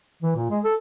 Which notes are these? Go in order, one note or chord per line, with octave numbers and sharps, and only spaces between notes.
E3
A#2
G#3
A4